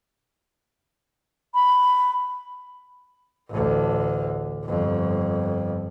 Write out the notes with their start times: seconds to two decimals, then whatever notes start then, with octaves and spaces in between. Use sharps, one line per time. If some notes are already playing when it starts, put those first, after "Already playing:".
1.55 B5
3.49 A1 D2
4.64 G1 F2